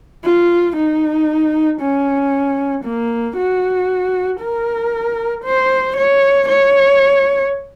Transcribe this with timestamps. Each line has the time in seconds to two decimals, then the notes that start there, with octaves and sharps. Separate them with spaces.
0.24 F4
0.76 D#4
1.81 C#4
2.84 A#3
3.37 F#4
4.41 A#4
5.44 C5
5.97 C#5
6.48 C#5